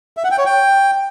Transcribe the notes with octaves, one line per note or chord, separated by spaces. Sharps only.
E5
F#5
G5
C#5
G5